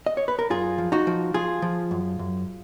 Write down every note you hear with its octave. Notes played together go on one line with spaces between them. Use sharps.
D#5
C#5
B4
A#4
F#2 F4 G#4
F3
D#4 F#4
F3
F3 F4 G#4
F3
F#2
F#2